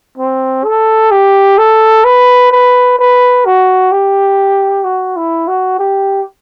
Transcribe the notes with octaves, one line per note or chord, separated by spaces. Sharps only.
C4
A4
G4
A4
B4
B4
B4
F#4
G4
F#4
E4
F#4
G4